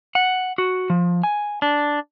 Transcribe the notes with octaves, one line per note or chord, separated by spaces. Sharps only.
F#5
F#4
F3
G#5
D4